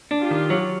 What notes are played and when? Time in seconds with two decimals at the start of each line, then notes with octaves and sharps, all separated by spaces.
0.11 D4
0.21 F4 G4
0.31 D#3
0.50 F#3